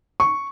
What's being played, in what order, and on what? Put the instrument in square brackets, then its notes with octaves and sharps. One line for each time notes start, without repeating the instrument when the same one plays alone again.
[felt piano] C#6